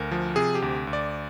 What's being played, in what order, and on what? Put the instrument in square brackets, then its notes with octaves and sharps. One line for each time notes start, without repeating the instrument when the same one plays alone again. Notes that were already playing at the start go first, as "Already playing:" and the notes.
Already playing: [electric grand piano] D2 A#4
F3
C3 G#4
G4
D2
D2
D5